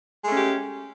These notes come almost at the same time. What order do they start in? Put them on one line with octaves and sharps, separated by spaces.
G#3 A3 C#4 G4